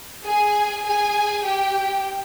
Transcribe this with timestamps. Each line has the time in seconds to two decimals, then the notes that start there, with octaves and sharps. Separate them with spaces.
0.25 G#4 G#5
0.85 G#4 G#5
1.44 G4 G5